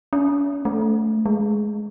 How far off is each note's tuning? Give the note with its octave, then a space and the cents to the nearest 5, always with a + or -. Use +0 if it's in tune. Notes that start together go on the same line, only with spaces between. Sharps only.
C#4 +45
A3 +0
G#3 +10